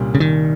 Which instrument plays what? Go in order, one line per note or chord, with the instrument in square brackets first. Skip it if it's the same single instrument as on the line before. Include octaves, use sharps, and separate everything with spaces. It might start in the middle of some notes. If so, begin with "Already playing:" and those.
Already playing: [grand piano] C2 A#2 G3 C#4
[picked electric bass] C#3
D#3